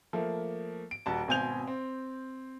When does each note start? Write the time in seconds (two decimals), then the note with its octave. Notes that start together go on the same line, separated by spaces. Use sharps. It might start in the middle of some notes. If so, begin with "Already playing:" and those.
0.13 F3 A3 A#3
0.91 D7
1.06 D#1 F#4 A5
1.28 G#1 B2 C4 G#5 G6 F7
1.67 C4